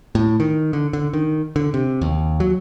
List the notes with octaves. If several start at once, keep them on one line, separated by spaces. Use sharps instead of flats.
A2
D#3
D3
D3
D#3
D3
C3
D#2
F#3